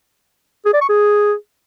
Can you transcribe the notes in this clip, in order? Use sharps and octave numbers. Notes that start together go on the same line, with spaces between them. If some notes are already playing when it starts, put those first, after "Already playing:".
G#4
D5
C#6
G#4